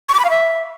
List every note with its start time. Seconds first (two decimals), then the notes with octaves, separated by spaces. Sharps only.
0.09 C#6
0.14 D6
0.19 B5
0.24 F5
0.30 E5